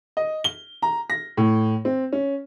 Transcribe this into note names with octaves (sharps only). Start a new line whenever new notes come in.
D#5
G7
A#5
A#6
A2
C4
C#4